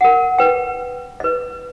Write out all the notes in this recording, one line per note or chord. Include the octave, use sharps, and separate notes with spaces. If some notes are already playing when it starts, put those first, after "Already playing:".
A#4 F#5
B4 G5
B4 D#5